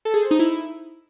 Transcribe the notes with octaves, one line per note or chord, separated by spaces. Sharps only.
A4
G#4
C5
D#4
E4